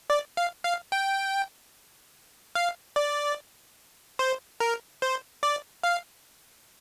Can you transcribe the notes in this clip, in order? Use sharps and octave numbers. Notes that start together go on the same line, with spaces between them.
D5
F5
F5
G5
F5
D5
C5
A#4
C5
D5
F5